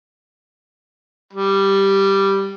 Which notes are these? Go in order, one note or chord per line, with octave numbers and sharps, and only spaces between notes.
G3